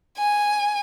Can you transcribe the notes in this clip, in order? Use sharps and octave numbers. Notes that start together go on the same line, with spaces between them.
G#5